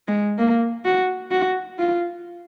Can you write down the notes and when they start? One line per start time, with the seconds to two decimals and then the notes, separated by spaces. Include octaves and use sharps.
0.08 G#3
0.38 A#3
0.85 F#4
1.31 F#4
1.79 F4